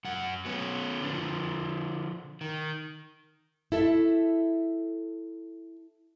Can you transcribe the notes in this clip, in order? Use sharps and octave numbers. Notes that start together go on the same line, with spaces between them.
F#2 F#5
F#3 B3 C#4
D3 F3
D#3
E4 A4 E5